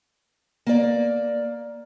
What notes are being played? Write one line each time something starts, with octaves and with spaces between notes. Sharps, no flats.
A#3 D5